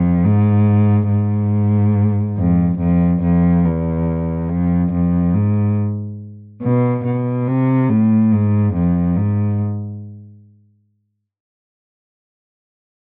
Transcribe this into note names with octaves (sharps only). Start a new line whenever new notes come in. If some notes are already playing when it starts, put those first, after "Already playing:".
Already playing: F2
G#2
G#2
F2
F2
F2
E2
F2
F2
G#2
B2
B2
C3
A2
G#2
F2
G#2